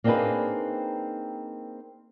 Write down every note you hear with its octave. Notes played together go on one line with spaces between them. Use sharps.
A#3 C4 D4 D#4 G#4 B4